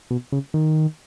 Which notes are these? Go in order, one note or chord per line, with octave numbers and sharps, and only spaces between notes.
B2
C#3
D#3